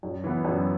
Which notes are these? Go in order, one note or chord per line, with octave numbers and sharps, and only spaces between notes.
F#2
E3 B3
F#2